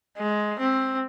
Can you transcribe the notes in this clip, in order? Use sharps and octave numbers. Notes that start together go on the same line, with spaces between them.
G#3
C4